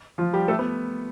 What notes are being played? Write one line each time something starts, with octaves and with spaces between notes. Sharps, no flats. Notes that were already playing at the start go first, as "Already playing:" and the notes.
F3 F4
G3 G4
A3 A4
B3 B4